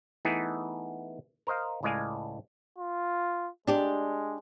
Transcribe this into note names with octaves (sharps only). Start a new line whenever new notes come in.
E3 A3 B3 D#4 E4 G#4
A#4 C5 D#5 F5
C#2 A2 G#3 D5 F5 G#5
F4
G#3 D4 G4 D5